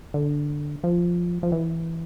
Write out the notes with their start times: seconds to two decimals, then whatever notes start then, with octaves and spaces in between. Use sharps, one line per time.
0.14 D3
0.84 F3
1.43 F3
1.52 E3